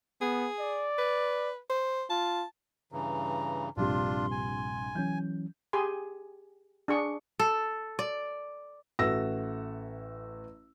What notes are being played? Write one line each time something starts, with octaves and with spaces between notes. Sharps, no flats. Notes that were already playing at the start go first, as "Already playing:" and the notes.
B3 G#4
D5
B4
C5
F4 A5
G2 C#3 E3 A#5
A#1 G2 C3 D4 F4 C6
G#5
E3 F#3 C#4 G6
G4 G#4 G#5 C6
D4 G#4 C#6
A4
D5
A1 F#4 A4 E5 E6 A#6